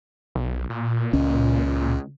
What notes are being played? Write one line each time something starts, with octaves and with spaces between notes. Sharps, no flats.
B1
A#2
C#2 C#4